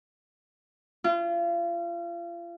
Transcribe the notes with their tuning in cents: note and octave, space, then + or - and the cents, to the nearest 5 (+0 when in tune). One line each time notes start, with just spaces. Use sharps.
F4 -35